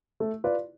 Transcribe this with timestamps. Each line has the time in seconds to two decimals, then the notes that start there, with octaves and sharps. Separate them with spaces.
0.20 A3
0.44 F4 B4 D5